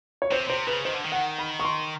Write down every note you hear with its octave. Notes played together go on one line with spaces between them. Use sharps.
C#5
C3 C5
C3 C5
C#3 B4
D#3 C5
D3
D#3
F#5
B5
C#6
C6